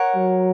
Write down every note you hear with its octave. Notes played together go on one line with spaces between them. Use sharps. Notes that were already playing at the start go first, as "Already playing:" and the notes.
Already playing: A#4 C#5 F#5
F#3